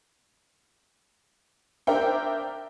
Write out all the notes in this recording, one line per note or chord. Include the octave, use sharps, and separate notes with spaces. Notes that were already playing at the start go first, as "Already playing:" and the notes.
D4 A#4 C5 E5 G5